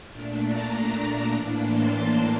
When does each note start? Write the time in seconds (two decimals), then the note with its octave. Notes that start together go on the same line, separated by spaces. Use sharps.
0.12 A#2 A3 D4 D6 F6
0.41 A#5 D6
1.32 A2 E3 A#3 D4
1.62 A5 C6